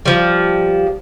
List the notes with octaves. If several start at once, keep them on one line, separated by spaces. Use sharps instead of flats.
F3 G3